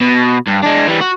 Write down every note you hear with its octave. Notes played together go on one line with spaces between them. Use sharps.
B2
G2
G#3 D4
E3 G3
F#4